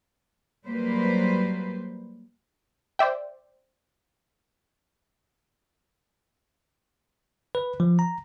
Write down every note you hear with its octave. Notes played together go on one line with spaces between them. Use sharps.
F#3 G3 A#3 B4 C5
C5 D5 E5 G5
B4
F3
A#5